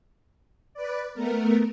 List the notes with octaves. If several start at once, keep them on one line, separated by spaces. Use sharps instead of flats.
B4 D5
A3 B3 A#4